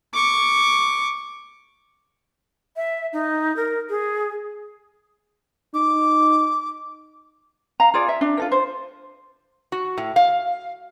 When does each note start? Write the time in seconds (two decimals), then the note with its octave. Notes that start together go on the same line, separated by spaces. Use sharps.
0.13 C#6 D6
2.76 E5
3.13 D#4
3.56 A#4
3.89 G#4
5.74 D#4 D6
7.80 F5 A#5
7.94 F4 G#4 D5
8.08 E5
8.21 D4
8.37 F4 A4 A#4
8.52 C5
9.72 F#4
9.98 A2
10.16 F5